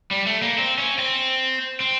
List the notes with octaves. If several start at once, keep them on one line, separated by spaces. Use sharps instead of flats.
G3
A3
A#3
C4
C#4
C4
C4